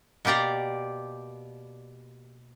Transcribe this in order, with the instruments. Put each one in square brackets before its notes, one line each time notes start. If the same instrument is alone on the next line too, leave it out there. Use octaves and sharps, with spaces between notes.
[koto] B2 A#3 G4 D5 A#5